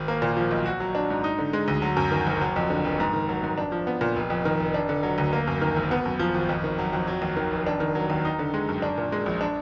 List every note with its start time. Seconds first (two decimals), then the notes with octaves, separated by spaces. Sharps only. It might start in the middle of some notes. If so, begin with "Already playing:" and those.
Already playing: G#1
0.08 A#3
0.22 A#2
0.37 F3
0.51 B1
0.66 F#4
0.80 F#3
0.95 D4
1.10 G#2
1.24 D#4
1.38 D3
1.53 G#3
1.68 D2
1.82 F#3
1.97 F#2
2.11 D#3
2.27 F#1
2.41 F#3
2.56 F2
2.70 D3
2.84 F1
3.00 G#2
3.13 D#3
3.29 F#3
3.43 G#2
3.58 D4
3.72 F3
3.87 B3
4.01 A#2
4.16 F1
4.30 F2
4.45 D#3
4.60 F1
4.74 D4
4.89 D3
5.03 F#3
5.18 D2
5.33 A#3
5.47 F#2
5.61 D#3
5.76 G#1
5.91 B3
6.05 F#2
6.19 F3
6.34 G#1
6.49 F2
6.64 D#3
6.78 F#3
6.93 F2
7.07 F#3
7.22 D#2
7.36 D#3
7.51 F1
7.66 D4
7.80 D#3
7.95 F#3
8.10 D#2
8.25 D#4
8.39 D3
8.54 G#3
8.69 F#2
8.82 D4
8.98 A#2
9.12 G#3
9.26 A#1
9.41 D4